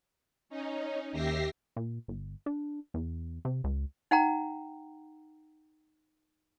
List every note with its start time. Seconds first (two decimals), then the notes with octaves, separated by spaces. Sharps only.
0.49 C#4 D#4
1.12 D#2 G4 E5 A#6 C7
1.76 A#2
2.08 G1
2.46 D4
2.94 E2
3.45 C3
3.64 C#2
4.11 D#4 F#5 G5 A#5